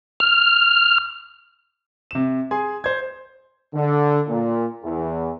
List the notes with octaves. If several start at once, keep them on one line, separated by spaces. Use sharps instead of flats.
F6
C3 E7
G#4 G#5 C6
C5 G#6
D3
A#2
E2